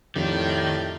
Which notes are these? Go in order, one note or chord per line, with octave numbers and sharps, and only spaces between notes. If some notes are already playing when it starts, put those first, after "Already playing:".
F2 A2 D#3 F4 G4 D5